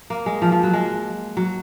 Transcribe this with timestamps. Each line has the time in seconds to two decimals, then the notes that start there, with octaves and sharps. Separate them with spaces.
0.10 A#3
0.26 G#3
0.42 F3
0.52 F3
0.63 F#3
0.73 G#3
1.37 F#3